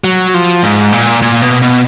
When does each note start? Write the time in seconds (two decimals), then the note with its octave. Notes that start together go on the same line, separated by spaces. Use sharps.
0.04 F#3
0.34 F3
0.63 G#2
0.92 A#2
1.22 A#2
1.42 B2
1.62 B2